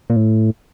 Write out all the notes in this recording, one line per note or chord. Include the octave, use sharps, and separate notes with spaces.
A#2
A2